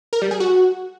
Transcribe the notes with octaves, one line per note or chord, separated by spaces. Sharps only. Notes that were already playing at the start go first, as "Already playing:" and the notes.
A#4
G3
G#4
F#4